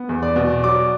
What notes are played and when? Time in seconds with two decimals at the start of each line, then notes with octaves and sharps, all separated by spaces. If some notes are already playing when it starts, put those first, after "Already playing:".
Already playing: B3
0.09 E2
0.22 D5 D6
0.36 B2
0.63 F#3 D5 D6